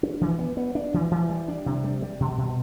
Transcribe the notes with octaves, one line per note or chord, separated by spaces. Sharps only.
D4
E3
B3
B3
D4
E3
E3
G3
D4
C3
G3
G3
B2
B2